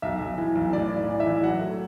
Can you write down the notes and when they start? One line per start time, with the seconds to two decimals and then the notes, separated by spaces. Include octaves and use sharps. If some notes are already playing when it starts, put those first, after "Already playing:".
0.02 B1 E5
0.20 B1
0.38 E3
0.55 B1
0.73 A2 D5
0.91 A2
0.97 D5
1.08 E3
1.20 E5
1.26 E3
1.43 F#3 F#5
1.61 A3